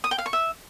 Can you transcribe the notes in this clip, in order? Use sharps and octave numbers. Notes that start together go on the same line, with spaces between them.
D#6
G5
F5
C#6
E5